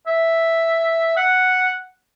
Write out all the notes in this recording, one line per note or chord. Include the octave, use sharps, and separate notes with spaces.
E5
F#5